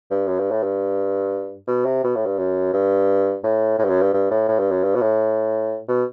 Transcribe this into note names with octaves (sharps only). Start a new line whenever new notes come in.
G2
F#2
G2
A2
G2
B2
C3
B2
A2
G2
F#2
G2
A2
A2
G2
F#2
G2
G2
A2
A2
G2
F#2
G2
B2
A2
B2